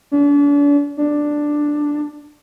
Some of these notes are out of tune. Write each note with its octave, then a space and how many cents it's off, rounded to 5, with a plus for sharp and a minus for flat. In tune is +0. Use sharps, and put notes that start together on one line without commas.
D4 -40
D4 +5